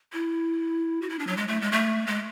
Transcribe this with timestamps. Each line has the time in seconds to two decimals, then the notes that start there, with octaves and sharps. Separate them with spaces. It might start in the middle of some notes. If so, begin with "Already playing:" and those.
0.13 E4
1.02 F#4
1.09 E4
1.19 D4
1.27 F#3
1.37 G#3
1.48 A3
1.61 G#3
1.72 A3
2.07 G#3